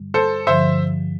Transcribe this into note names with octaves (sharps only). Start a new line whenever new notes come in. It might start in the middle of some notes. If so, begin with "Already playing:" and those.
Already playing: G2 D3 G3
A4 C5
G2 D3 F3 C5 E5